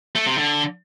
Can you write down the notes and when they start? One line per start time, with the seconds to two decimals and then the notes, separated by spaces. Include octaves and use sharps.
0.15 A3
0.27 C3
0.38 D3